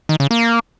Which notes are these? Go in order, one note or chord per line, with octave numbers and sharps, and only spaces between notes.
D#3
C#3
A#3